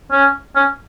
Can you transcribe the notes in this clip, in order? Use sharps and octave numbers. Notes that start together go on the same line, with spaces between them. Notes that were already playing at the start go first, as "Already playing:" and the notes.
C#4
C#4